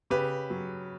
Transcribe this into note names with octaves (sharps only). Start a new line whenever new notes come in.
C#3 G4 B4
F#3